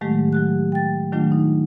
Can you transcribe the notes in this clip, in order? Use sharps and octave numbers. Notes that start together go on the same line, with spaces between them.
A2 D#3 F#3 G#3 A3 G4
F#3 G4 F#6
G5 A6
D#3 F#3 A3 D4 F4
D#4